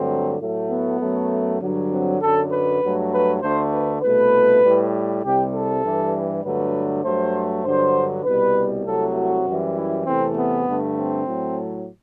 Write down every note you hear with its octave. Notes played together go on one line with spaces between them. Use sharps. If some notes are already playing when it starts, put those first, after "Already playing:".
Already playing: G2 D3 F#3 A3 C4
A2 F#3 A3
B3
F#2 F#3 A3
G2 D3 F#3
C4
F#2 D3 F#3 A4
B4
G2 F#3 A3
B4
D2 D3 A3 C5
B4
C2 B2 A3 B4
A2 G3
C2 C3 G3 G4
A4
G2 E3 G3
G2 D3 F#3 A3 B4
G2 F#3 A3 C5
G2 D3 F#3 C5
C2 B2 G3 B4
C2 C3 F#3 A3 A4
F#4
F#2 E3 G3
E4
E2 C3 E3 A3 C4
B3
G2 D3 A3
C4
A2 F#3 A3